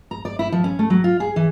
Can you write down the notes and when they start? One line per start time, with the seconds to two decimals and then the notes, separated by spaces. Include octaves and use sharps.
0.11 A#5
0.25 D5
0.39 E4
0.52 F3
0.64 C#4
0.79 A3
0.90 F#3
1.04 F4
1.20 G#4
1.36 E3